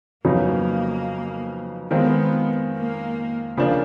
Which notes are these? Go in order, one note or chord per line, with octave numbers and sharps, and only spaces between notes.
F2 C#3 F#3 A#3 B3 D#4
D#3 G#3 B3 C4 F4
A#3
C#3 F3 A#3 D4